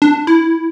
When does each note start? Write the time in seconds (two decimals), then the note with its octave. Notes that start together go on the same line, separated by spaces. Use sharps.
0.02 D4
0.27 E4